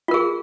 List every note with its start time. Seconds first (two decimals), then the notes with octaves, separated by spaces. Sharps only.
0.08 F4
0.11 A#4
0.14 G#4